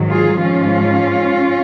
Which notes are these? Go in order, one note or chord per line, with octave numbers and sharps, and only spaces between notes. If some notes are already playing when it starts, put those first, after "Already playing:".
Already playing: G#2 D#3 F#3
F4 G#4
G#2 F3 C#4 F4